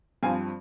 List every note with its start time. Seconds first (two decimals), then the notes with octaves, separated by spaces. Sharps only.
0.23 G2 F3 C4 F5 G#5